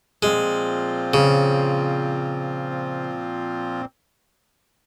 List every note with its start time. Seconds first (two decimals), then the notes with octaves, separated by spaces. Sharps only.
0.23 A#2 F3 G#3 C4 F4
1.14 C#3